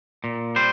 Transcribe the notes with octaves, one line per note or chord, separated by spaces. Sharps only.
A#2
G3 C5